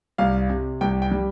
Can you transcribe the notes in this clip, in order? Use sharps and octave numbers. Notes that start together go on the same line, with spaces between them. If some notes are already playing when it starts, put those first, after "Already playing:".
C2 F5
C3
C2 G5
G5
G3